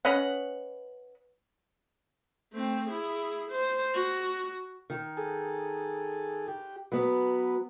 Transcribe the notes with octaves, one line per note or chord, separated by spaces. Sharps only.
C#4 B4 D#5 F#5
A3 C4
E4 G#4
C5
F#4
D#3
G#4 A4
G4
F#3 B3 B4